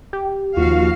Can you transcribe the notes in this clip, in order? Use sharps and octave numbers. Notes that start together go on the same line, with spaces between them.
G4
D#2 F3 F4 F#4 F5